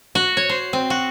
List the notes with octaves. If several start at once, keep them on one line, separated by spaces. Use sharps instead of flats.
F#4
C#5
C5
C4
F#4